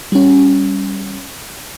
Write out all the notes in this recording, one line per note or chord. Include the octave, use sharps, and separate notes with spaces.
G3 C#4